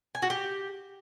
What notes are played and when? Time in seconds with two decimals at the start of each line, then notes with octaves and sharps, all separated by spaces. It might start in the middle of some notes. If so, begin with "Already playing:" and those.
0.15 G#5
0.22 F#4
0.30 G4